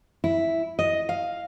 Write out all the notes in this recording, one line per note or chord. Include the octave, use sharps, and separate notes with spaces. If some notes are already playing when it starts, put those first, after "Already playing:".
E4
D#5
F5